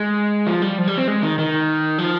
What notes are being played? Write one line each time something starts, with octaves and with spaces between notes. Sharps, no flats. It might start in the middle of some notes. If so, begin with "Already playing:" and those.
Already playing: G#3
F3
G3
F3
G3
C4
G#3
D#3
D#3
F3